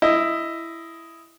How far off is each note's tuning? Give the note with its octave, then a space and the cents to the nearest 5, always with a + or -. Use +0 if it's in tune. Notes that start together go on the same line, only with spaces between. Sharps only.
E4 +10 D#5 +10